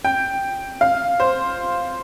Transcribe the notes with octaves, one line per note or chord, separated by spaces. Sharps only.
G5
F5
C5